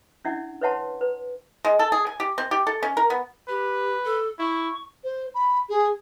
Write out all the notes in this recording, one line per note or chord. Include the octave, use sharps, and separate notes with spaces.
C#4 D4 E4 D5 E5 F#5
B4 C#5 E5 F#5 A5 C6
B4
G#3
A4
G#4
G#5
G4
C4
G4
A4
C#4
A#4
B3
G4 B4
A4
E4 C#6
C5
B5
G#4